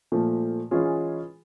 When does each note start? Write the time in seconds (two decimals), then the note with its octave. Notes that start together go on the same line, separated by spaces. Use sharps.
0.12 A#2 F3 A3
0.71 E3 G#3 C#4 F4 G#4